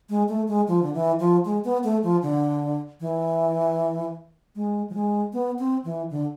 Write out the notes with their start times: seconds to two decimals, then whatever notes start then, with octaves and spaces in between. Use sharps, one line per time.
0.09 G#3
0.29 A3
0.48 G#3
0.68 F3
0.83 D3
0.94 E3
1.19 F3
1.45 G#3
1.64 B3
1.84 A3
2.03 F3
2.22 D3
3.00 E3
4.55 G#3
4.90 F3
4.94 G#3
5.33 B3
5.59 C4
5.84 E3
6.10 D3